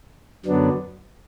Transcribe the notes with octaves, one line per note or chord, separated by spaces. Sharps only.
F#2 D3 F#3 B3 D4